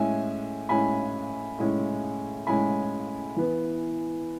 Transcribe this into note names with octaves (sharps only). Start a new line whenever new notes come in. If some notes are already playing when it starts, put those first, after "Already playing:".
Already playing: A2 G#3 C#4 E5 G#5
A2 G#3 C#4 G#5 B5
A2 G#3 C#4
A2 G#3 C#4 G#5 B5
E3 B3